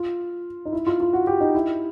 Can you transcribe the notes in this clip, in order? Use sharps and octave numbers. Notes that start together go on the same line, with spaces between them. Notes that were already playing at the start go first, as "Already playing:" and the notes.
Already playing: F4
D#4
E4
F4
F4
F#4
G4
D#4
E4